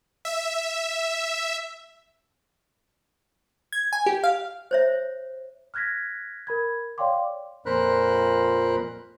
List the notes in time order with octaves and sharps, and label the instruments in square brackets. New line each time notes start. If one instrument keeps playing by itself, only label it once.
[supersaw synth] E5
[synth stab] G#6
G#5
G4
F5
[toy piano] C5 C#5 E5
[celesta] F6 F#6 G#6 A#6 B6
A#4 B5 G#6
C#5 D5 F5 G5 C6 D6
[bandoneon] F2 A#2 A#4 C5 B5 F#6